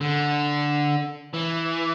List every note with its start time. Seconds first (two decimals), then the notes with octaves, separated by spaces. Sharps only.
0.01 D3
1.34 E3